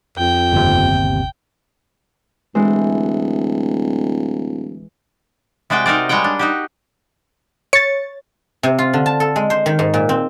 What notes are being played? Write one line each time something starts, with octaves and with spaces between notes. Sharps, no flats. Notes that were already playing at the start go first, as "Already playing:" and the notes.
F2 G5
G1 D#2 C3
D1 E3 G#3 C5
C3 G#3 F#4 D5 G5
D#4 A#4 C5 D5
G3 G#3 C#5 F#5 G5
D4
D#4 F#4 G4
C#5 A6 C#7
C3
F4
D3
A5
A4
G#3
C5
D#3
G#2
A#2
C4